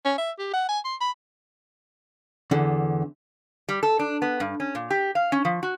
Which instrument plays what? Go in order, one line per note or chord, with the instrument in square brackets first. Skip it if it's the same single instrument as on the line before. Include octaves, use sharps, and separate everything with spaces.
[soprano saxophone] C#4
E5
G4
F#5
G#5
C6
B5
[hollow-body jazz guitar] E2 D3
[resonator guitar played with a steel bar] G3
A4
D4
B3
G2
C#4
A#2
G4
F5
C#4
F3
F#4